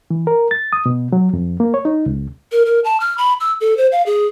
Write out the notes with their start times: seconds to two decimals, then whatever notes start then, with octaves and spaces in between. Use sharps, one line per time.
0.11 E3
0.27 A#4
0.51 A6
0.73 D#6
0.86 B2
1.12 F#3
1.34 F2
1.60 A#3
1.74 C#5
1.85 D#4
2.06 C#2
2.52 A#4
2.66 A#4
2.84 A5
3.00 F6
3.18 B5
3.40 E6
3.61 A4
3.77 C5
3.92 F5
4.06 G#4